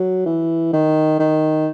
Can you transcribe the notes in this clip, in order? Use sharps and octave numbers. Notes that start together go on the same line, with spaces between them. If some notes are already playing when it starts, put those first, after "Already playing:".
Already playing: F#3
E3
D#3
D#3